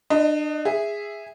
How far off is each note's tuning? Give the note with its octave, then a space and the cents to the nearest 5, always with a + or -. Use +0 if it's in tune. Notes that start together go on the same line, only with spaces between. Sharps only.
D4 +30 D#5 +0
G#4 -10 E5 +0